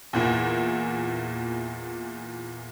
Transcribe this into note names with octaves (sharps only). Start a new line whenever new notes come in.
E2 A#2 E3